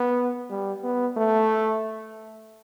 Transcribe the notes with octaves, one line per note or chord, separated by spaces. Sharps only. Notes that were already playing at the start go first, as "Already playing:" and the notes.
Already playing: B3
G3
B3
A3